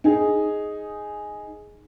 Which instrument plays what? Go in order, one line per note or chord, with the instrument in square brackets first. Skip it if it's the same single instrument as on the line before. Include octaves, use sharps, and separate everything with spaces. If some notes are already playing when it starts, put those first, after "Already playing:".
[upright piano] D#4 G#4